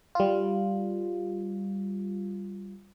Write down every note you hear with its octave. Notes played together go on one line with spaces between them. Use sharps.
G3 F4